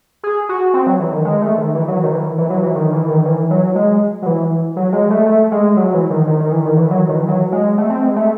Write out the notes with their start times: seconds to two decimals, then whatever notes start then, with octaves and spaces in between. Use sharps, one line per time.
0.23 G#4
0.49 F#4
0.74 C4
0.86 F#3
1.00 E3
1.12 D#3
1.25 G#3
1.42 A3
1.58 D#3
1.75 E3
1.88 F#3
2.03 D#3
2.12 E3
2.38 E3
2.50 F#3
2.63 E3
2.75 D#3
2.92 E3
3.08 D#3
3.25 E3
3.51 F#3
3.75 G#3
4.22 F#3
4.26 E3
4.76 F#3
4.92 G#3
5.10 A3
5.26 A3
5.52 G#3
5.77 F#3
5.88 F#3
5.94 E3
6.10 D#3
6.27 D#3
6.40 D#3
6.52 E3
6.65 D#3
6.77 E3
6.90 F#3
7.09 D#3
7.16 E3
7.28 F#3
7.52 G#3
7.78 A3
7.90 C4
8.02 G#3
8.16 A3